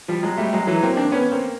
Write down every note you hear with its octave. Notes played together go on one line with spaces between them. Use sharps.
F3 G3
F#3 G#3
G3 A3
F#3 G#3
E3 F#3
A#3 C4
C4 D4
B3 C#4
A#3 C4